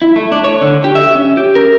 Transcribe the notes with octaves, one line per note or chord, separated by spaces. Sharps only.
E4
A3
D4
C#5
D3
G4
E5
C#4
G4
A#4